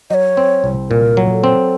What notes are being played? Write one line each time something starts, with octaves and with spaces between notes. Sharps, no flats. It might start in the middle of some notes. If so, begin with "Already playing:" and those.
F#3 C#5 D#5
C4
C2
A#2 A#4
F#3
A4
C4